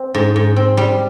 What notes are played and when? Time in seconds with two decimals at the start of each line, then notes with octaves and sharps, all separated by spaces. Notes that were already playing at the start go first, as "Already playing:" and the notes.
Already playing: C4
0.14 G#2
0.36 G#2
0.56 C4
0.77 G3